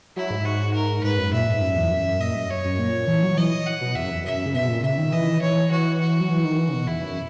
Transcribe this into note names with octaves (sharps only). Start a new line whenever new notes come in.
F#3 E4
G#2
F#4
A#4
G#2 B4
F#2
A#2 E5
G#2
F#2
E2
F#2
A#2 D#5
F#2
C#5
F#2
A#2
E3
F#3
E3 D#5
F#5
B2
E2 E5
F#2
E2
F#2 E5
C#3
B2 E5
A#2
C#3 E5
D#3
E3 D#5
E3 C#5
E3 F#4
F#4
F#3
E3
D#3
E3
C#3
B2
E2 E4
F#2